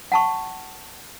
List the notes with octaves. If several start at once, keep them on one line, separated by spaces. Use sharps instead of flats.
F#5 A5 C#6